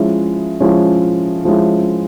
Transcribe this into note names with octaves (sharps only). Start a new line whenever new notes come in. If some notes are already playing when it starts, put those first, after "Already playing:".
Already playing: F3 G#3 C#4 E4
F3 G#3 C#4 E4
F3 G#3 C#4 E4